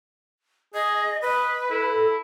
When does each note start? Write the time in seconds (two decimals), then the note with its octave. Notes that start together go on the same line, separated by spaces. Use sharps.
0.74 G#4 D#5
1.22 B4 D#5
1.71 E4 A4